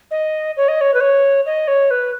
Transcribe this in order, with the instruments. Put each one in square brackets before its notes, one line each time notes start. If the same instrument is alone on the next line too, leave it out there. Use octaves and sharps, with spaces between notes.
[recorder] D#5
C#5
D#5
C#5
B4
C#5
D#5
C#5
B4